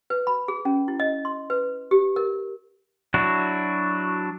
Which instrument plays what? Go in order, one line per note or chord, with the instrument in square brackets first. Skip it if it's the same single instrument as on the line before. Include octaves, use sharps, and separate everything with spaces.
[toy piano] B4
B5
G#4
C#4
E4
D#5
C6
B4
G4
A#4
[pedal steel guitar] F#3 D4 E4 F#4